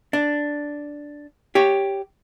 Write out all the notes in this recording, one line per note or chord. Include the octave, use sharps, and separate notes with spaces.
D4
G4 C#5